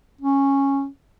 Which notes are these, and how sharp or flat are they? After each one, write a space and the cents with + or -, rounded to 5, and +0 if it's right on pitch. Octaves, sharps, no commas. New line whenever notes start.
C#4 -10